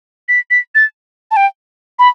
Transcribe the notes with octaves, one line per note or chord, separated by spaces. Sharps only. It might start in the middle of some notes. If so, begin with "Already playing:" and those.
B6
B6
A6
A5
G5
B5